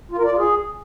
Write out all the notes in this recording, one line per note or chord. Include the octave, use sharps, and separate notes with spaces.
F4
A#4
D5
F4
G#4